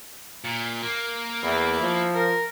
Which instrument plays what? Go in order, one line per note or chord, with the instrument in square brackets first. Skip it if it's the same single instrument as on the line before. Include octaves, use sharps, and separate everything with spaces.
[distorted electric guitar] A#2
A#3
[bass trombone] E2 [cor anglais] E4
[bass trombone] F3
[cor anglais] A#4